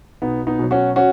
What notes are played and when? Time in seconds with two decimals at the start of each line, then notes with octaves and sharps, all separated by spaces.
0.22 B1 B3 D#4
0.47 B3 D#4
0.59 B2 F#3
0.71 C#4 F#4
0.96 C#4 F#4